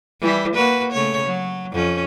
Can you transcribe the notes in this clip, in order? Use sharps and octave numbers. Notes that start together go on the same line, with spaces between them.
E3 G3 E4
A#3 F#4 B4
C#3 A3 C#5
F#3
F2 C#4